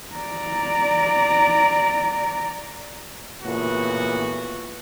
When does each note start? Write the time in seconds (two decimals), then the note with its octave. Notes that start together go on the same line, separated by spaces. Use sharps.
0.15 D5 A#5
3.43 A#2 C#3 E3 A3 B3 F#4